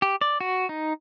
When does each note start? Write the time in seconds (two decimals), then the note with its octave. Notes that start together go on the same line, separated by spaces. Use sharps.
0.02 G4
0.21 D5
0.41 F#4
0.69 D#4